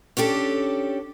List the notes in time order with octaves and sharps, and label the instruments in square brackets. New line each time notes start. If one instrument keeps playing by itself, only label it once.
[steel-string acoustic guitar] C#4 D4 G4 A4